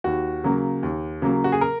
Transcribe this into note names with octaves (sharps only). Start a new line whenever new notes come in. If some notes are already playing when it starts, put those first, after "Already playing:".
D#2 F#4
C#3 F#3 A#3
D#2
C#3 F#3 A#3
F#4
G#4
A#4